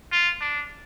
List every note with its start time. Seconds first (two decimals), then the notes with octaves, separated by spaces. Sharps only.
0.12 F4
0.41 D4